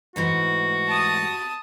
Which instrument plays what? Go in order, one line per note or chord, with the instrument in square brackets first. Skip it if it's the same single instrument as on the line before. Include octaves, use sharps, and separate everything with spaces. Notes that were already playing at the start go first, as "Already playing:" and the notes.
[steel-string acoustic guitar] G#2 E3 A3 [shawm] F#4
[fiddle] A5 D#6